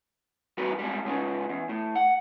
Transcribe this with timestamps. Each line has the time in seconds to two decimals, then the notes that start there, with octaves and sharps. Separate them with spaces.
0.57 E2 G3 C4 F#4 A#4 B4
0.79 G3 G#3 C4
1.05 C#3 G#3 B3 C#4
1.49 E2
1.69 A2
1.96 F#5